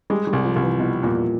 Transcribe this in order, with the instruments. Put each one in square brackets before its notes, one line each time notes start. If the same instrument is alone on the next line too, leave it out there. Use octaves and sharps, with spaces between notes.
[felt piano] G3 [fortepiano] G#3
[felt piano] G3
[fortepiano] C2
[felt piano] F3
[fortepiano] C2
[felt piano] E3
[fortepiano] B2 [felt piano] E3
[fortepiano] E2 [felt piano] A#2